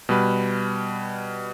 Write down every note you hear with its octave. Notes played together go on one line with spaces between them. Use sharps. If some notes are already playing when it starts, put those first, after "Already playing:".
B2 G3 B4